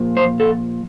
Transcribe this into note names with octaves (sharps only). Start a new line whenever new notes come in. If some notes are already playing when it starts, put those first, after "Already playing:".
Already playing: A#2 F3
C5
A4